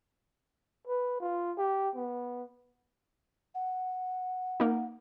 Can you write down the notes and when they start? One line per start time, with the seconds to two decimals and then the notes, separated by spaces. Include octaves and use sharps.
0.87 B4
1.21 F4
1.58 G4
1.95 B3
3.55 F#5
4.60 A#3 D#4